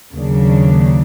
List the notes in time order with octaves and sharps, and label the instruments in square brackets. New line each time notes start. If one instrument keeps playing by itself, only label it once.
[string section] D#2 C#3 F#3 A#3 D4